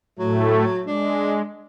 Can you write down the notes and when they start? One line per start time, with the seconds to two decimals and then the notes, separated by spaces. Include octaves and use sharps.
0.19 A2 F#3 A3
0.86 G#3 D4